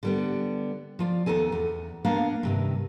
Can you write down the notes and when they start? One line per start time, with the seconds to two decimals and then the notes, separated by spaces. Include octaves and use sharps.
0.03 D3 G3 B3
0.99 F3 F4 D5
1.26 D#2 B3 D#4 A4 G#5
1.52 E2
2.05 A#3 B3 D4 F5
2.43 G2 C3 D#3